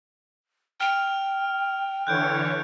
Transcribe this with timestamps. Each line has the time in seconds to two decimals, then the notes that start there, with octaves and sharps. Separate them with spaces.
0.80 G5 F6 F7
2.07 D3 E3 C#5 F#6 G6 D7